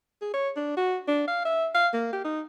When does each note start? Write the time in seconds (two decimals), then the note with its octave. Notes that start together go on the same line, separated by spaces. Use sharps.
0.22 G#4
0.33 C#5
0.56 D4
0.77 F#4
1.08 D4
1.28 F5
1.45 E5
1.75 F5
1.93 A#3
2.13 G4
2.25 D#4